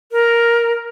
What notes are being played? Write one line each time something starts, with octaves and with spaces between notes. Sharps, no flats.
A#4